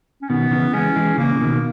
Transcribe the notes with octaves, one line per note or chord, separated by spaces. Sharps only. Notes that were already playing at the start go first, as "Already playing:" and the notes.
C#4
B2 D#3 B3
C#3 E3
E3 G#3 C#4
E3 G#3
C#3 E3 A#3
C#3
B2 D#3